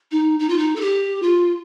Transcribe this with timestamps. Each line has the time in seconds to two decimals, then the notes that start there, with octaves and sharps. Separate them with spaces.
0.11 D#4
0.39 D#4
0.49 F4
0.58 D#4
0.76 A4
0.81 G4
1.22 F4